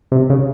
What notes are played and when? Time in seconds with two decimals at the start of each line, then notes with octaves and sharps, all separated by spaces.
0.12 C3
0.30 C#3